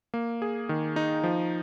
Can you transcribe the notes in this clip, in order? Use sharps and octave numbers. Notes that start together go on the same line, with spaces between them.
A#3
G#4
D#3
D#4
F3